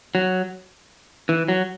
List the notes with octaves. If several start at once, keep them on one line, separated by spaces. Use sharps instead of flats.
F#3
E3
F#3